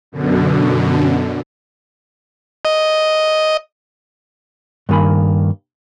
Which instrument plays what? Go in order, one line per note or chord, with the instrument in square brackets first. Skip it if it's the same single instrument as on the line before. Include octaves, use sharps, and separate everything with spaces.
[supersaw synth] F#2 B2 D3
[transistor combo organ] D#5
[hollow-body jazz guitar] G2 D#3 A#3 G#5 B5